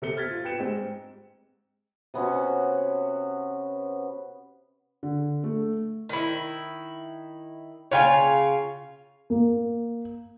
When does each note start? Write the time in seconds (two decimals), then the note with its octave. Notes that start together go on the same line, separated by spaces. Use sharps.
0.02 C3 A4 C#7 G7
0.17 F6 G#6 A6 B6
0.31 F4
0.44 B4 G5 C#7 E7
0.58 G#2 G#3 C4 G4
2.14 C3 B3 C#4 F#4
5.03 D3
5.44 A3
6.09 D#3 E4
7.91 C#3 F4 C#5 F5 G5 G#5
9.30 A#3